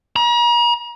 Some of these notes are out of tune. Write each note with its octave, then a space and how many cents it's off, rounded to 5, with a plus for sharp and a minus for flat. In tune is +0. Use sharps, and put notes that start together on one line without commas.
A#5 +40